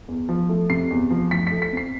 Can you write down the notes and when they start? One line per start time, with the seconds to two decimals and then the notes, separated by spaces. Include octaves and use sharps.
0.08 E2
0.29 F3
0.49 A3
0.70 C3 C7
0.91 E2
1.10 F3
1.31 D2 B6
1.47 A3 B6
1.62 B6
1.72 C4 C7